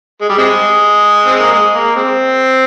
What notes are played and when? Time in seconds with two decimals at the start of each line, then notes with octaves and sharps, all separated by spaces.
0.22 G#3
0.29 G3
0.38 C3 G#3
1.26 C4
1.39 A#3
1.53 G#3
1.74 A#3
1.96 G#3 C4